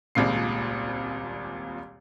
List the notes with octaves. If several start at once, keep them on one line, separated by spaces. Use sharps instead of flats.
D#1 G#1 C#2 A#2 C4 C7